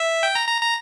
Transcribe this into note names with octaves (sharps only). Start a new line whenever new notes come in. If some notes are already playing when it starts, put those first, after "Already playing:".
Already playing: E5
G5
A#5
A#5
A#5